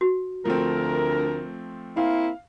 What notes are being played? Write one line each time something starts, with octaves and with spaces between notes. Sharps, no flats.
F#4
D2 F3 A3 C4 A#4
A#3 C4 E4 F5